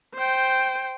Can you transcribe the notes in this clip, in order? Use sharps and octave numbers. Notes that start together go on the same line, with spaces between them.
C5 G5